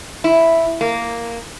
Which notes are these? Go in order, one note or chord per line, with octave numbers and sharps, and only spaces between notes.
E4
A#3